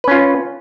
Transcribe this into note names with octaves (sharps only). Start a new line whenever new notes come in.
C#4 F4 B4